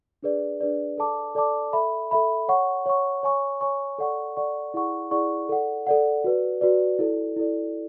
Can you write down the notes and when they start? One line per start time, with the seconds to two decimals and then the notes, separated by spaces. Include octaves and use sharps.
0.23 D4 G#4 B4 D5
0.61 D4 G#4 B4 D5
0.98 A4 D5 A5 D6
1.35 A4 D5 A5 D6
1.73 A4 E5 B5
2.11 A4 E5 B5
2.48 C#5 F#5 C#6
2.86 C#5 F#5 C#6
3.23 C#5 G#5 C#6
3.61 C#5 G#5 C#6
3.98 A4 D5 F#5 C#6
4.37 A4 D5 F#5 C#6
4.74 E4 G#4 D5 F#5 C#6
5.11 E4 G#4 D5 F#5 C#6
5.49 A4 D5 F#5
5.87 A4 D5 F#5
6.24 F#4 B4 D5
6.61 F#4 B4 D5
6.99 E4 A4 D5
7.36 E4 A4 D5